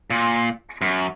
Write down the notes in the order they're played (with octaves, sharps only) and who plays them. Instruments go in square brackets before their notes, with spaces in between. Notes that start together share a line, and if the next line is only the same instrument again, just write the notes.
[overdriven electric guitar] A#2
F#2